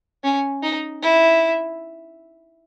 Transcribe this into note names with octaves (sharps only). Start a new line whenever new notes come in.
C#4
D#4
E4